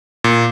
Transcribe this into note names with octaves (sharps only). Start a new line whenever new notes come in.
A#2